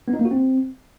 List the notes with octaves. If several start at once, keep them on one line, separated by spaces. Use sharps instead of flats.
B3
D#4
A#3
F#4
C4